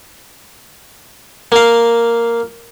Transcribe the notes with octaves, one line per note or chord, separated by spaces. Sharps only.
A#3 F5